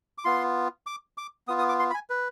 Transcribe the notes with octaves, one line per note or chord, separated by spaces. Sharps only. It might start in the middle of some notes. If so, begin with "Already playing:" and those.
D6
B3 F4 C6
D6
D6
B3 F4 D#6
D#6
D6
C6
B5
G#5
B4